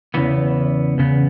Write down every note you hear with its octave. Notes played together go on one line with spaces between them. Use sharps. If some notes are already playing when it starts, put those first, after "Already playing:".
E2 C#3 E3 B3
E2 C#3 B3